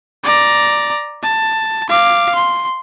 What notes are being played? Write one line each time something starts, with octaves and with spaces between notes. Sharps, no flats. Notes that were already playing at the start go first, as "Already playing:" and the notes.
D5 A#5
A5
F5 D6
C6